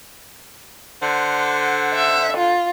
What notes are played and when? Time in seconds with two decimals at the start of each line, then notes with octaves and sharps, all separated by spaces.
1.02 D3 C5 F#5
1.94 E5
2.37 F4